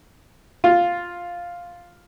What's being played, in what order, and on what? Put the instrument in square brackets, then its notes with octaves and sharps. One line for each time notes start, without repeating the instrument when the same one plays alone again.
[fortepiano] F4